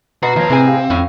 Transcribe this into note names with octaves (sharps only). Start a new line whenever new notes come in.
B2 F#4 B4 F#5 A#5 C7
D#2 F3 C#5 D#5 G#6 A#6
A2 C3 C4 G#4 G#5
F5 G5
F2 A2 C#4